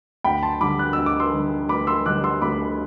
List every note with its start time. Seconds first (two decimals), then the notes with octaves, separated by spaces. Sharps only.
0.24 D2 G5 B5
0.43 A5 C6
0.61 D3 G3 B5 D6
0.79 F#6
0.93 D2 E6
1.06 D6
1.20 C6 E6
1.33 D3 G3
1.69 D2 B5 D6
1.87 C6 E6
2.06 D3 G3 D6 F#6
2.24 C6 E6
2.41 D2 B5 D6